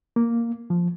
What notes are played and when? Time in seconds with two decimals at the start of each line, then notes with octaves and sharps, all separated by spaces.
0.16 A#3
0.70 F3